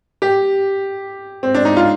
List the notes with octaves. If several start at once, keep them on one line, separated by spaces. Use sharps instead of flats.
G4
C4
D4
D#4
F4